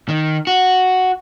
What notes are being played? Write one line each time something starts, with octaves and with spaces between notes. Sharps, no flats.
D#3
F#4